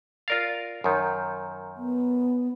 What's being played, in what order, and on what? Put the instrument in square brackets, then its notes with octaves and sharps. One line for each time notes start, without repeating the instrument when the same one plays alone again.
[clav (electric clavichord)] F4 A#4 F5 [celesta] D5 A6
[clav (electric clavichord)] F#2 D#3 [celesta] A#4 C#5 G6
[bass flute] B3